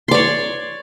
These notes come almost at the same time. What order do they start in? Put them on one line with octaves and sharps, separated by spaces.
C6 D5 C#5